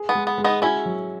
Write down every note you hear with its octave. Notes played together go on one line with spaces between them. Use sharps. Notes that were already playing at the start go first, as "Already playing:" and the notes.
Already playing: G#4
B3
G#3
B3
G#3
B3 D#4
C#4 E4 F#4
F#3